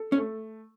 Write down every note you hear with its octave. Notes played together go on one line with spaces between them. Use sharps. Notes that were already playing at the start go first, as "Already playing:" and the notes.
Already playing: A4
C#4
A3